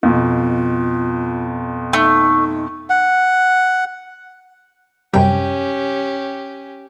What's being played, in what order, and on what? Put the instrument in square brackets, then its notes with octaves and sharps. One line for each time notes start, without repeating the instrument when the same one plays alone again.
[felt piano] F2 B2 [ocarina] F4
[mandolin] A3 [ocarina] D#4
[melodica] F#5
[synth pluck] F#2 C3 G3 [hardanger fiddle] C#4 G4 [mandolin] G5